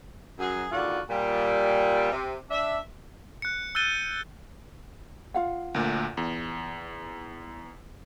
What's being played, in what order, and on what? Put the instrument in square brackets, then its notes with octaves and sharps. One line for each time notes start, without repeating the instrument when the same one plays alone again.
[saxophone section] F#2 F#3 G#4
D#2 D3 F4 F#4
A#2 G3
C3
D4 E5
[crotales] F#6 C#7
E6 F#6 G6 A6 D#7 G7
[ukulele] F4 F5 F#5
[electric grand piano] D2 A#2
E2